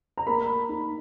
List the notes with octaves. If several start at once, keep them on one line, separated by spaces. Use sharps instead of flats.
A#5
A#3 B5
D#4